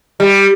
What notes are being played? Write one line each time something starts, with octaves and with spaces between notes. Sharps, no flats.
G3